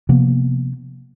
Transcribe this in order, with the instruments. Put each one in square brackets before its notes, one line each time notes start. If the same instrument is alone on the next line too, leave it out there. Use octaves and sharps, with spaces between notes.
[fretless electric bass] C3 F3 A#3 B3